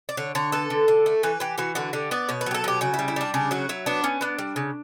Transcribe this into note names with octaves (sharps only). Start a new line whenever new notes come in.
D5
D3 C#5
D3 C#5
B3 A4
D3
D3
A3
E3 B4
E3 G4
E3 F#4
D3 F#4
D3 G4
B3 D5
B2 C#5
B4
F#3 G4
A4
B2 G4
C#3 F#4
E4
G3
E4
G3 D4
C#3 D4
F#3 F#4
F#3 E4
B3 D4
B3 C#4
B3 D4
G3
C#3